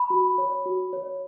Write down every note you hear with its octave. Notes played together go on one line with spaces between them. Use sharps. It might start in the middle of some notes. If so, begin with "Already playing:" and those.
Already playing: B5
F#4
C#5
F#4
C#5